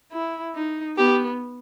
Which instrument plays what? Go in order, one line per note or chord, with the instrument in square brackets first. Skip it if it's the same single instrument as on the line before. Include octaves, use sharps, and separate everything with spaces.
[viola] E4
D#4
[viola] B3 [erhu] G4